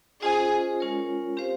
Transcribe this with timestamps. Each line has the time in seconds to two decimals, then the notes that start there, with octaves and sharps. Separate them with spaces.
0.22 C#4 F4 G#4 C5 D#5
0.80 G#3 C#4 F4 A#4 C#5
1.37 C4 G4 C5 F5